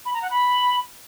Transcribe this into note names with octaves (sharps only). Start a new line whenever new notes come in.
B5
A#5
F#5
B5